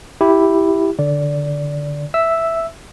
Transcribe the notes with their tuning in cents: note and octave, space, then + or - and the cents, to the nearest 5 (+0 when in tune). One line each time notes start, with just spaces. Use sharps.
E4 +0 G4 +0
D3 +0 D5 -15
E5 +0 E6 +0